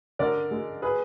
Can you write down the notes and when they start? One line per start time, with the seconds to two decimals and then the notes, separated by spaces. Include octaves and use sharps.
0.19 D3 A#4 D5
0.51 G#3
0.82 G#4 B4